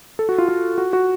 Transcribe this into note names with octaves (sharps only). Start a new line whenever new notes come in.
A4
F#4
F4
F4
F#4
F#4